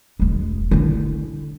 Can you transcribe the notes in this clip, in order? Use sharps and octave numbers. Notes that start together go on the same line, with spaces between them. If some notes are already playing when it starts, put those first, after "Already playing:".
E1 G#3
D3 E4